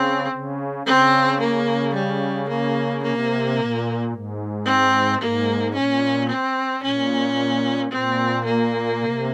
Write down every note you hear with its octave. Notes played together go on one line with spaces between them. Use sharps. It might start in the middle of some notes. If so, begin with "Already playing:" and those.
Already playing: C#3 C4
C#3
C#3 C4
A#3
G3
A#3
C3 A#3
A#2
G#2
C4
G#2 A#3
A#2 C#4
C4
A#2 C#4
A#2 C4
A#3
C3